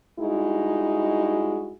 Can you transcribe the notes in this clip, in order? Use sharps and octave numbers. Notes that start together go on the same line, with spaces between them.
G2 G#3 D#4 E4 F#4